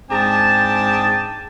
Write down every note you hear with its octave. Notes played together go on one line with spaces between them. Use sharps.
G#2 C4 D4 G#4 G5 A5